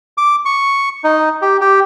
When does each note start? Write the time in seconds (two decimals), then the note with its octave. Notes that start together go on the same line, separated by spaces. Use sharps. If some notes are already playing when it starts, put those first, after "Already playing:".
0.18 D6
0.45 C#6
1.04 D#4
1.42 G4
1.61 G4